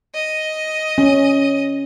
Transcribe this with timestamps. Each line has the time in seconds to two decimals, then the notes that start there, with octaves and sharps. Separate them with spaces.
0.15 D#5
0.98 C#4